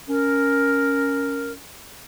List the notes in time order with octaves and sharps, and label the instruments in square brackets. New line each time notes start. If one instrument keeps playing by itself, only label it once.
[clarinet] C#4 [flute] A#4